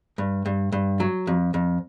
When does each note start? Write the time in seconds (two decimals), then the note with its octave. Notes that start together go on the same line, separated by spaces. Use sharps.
0.18 G2
0.46 G2
0.72 G2
1.00 F#3
1.27 F2
1.54 F2